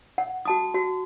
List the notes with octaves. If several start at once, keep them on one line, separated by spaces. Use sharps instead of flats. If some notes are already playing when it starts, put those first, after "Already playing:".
F#5
F#4 A5 D#6
F#4